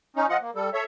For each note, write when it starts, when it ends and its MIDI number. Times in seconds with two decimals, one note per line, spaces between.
0.16 0.27 61
0.16 0.27 63
0.30 0.37 53
0.30 0.37 65
0.30 0.37 75
0.30 0.37 78
0.41 0.51 58
0.55 0.70 55
0.55 0.70 69
0.73 0.84 69
0.73 0.84 73
0.73 0.84 76